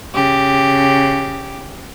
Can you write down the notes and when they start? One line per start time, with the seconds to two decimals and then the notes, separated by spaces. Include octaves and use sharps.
0.13 C#3 G4